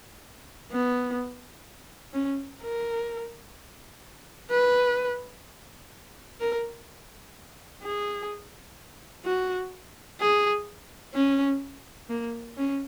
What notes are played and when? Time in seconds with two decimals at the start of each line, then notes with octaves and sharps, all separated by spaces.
0.71 B3
2.14 C#4
2.62 A#4
4.51 B4
6.40 A#4
7.82 G#4
9.24 F#4
10.20 G#4
11.14 C#4
12.09 A#3
12.57 C#4